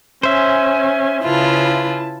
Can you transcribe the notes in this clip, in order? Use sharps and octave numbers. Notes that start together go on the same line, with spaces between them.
C#4 C5 E5 G#5
C#3 E4 F4 B4 A5